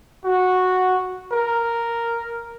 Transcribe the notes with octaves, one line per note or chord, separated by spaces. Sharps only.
F#4
A#4